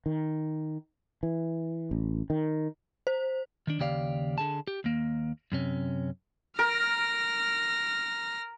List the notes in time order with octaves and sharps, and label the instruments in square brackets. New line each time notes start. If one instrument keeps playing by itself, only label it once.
[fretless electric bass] D#3
E3
A1
D#3
[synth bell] C5
[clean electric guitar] D#3 D4
D#2 C#3 G4 D5 F5
D3 G#4 A5
G4
D#2 A#3
F#2 C3 C#4
[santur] A#4 [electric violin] F6 A#6